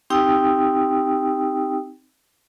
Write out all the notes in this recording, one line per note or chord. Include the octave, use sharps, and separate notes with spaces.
C4 D#4 G4 G5 D#6 E6